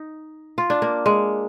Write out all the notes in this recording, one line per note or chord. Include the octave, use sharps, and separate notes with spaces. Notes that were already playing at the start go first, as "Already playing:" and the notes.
Already playing: D#4
F4
D4
A#3
G#3